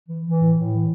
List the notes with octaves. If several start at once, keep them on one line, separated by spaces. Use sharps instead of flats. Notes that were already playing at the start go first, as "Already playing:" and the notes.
E3
E3
A2
A2
E3